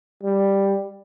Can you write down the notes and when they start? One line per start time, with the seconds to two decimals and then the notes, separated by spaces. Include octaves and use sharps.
0.23 G3